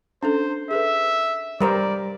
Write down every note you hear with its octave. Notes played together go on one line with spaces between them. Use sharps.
C#4 D4 A4 C5
G#4 A4 B4 E5
G3 A#4 C5 D5